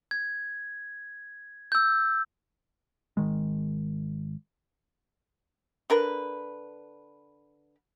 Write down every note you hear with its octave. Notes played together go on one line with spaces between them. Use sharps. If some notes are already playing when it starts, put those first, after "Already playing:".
G#6
E6 G6
G#1 D#3 G#3
D3 A#4 B4